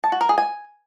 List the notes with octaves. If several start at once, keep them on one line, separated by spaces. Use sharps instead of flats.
A5
F#4
A#4
G#4
G#5